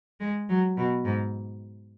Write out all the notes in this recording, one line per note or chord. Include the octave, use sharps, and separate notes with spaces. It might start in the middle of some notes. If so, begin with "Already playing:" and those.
G#3
F#3
B2
G#2